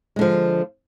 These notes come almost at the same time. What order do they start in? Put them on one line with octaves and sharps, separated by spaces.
G#3 D3 F3